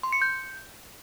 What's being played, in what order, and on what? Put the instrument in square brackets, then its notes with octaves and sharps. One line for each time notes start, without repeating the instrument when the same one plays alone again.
[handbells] C6
C#7
G6